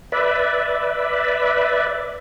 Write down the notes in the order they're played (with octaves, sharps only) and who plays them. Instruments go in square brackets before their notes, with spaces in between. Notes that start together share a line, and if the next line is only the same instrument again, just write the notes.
[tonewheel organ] B4 D5 E5